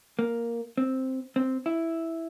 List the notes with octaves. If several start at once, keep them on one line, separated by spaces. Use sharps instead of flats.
A#3
C4
C4
E4